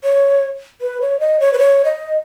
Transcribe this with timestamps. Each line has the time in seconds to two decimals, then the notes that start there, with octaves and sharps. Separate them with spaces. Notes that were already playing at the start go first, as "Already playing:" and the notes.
0.04 C#5
0.81 B4
1.01 C#5
1.20 D#5
1.40 C#5
1.53 B4
1.58 C#5
1.85 D#5